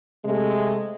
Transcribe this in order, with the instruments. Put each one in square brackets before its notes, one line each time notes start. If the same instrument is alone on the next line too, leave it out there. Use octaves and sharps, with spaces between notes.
[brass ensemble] C3 G#3 A3